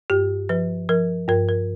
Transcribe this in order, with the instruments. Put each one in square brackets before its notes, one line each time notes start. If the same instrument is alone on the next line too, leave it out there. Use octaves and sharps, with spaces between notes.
[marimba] G2 G4
F3 B4
F3 A#4
G2 A#4
A#4